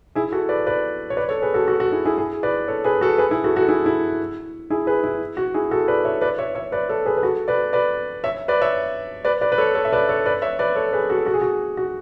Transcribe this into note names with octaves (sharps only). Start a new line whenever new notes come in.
E4 G#4
F#4 A4
B4 D5
B4 D5
C#5
B4 D5
A4 C#5
G#4 B4
F#4 A4
F#4 A4
F#4
E4 G#4
E4 G#4
E4 G#4
B4 D5
A4 C#5
G#4 B4
F#4 A4
G#4 B4
E4 G#4
F#4 A4
F#4 A4
E4 G#4
E4
E4 G#4
G#4 B4
E4
F#4
E4 G#4
F#4 A4
B4 D5
C#5 E5
B4 D5
C#5 E5
C#5 E5
B4 D5
A4 C#5
G#4 B4
B4
F#4 A4
B4 D5
B4 D5
C#5 E5
B4 D5
C#5 E5
B4 D5
B4 D5
B4
A4 C#5
A4 C#5
E5
B4 D5
A4 C#5
B4 D5
C#5 E5
B4 D5
A4 C#5
G#4 B4
F#4 A4
F#4
G#4
F#4
F#4